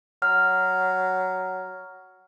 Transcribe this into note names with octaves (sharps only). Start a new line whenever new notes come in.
F#3 F6